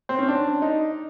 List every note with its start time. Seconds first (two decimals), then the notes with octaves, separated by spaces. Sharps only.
0.09 C4
0.19 C#4
0.28 D4
0.62 D#4